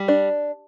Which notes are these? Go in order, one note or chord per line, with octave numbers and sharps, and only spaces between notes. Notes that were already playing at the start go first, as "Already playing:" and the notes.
Already playing: G3
D4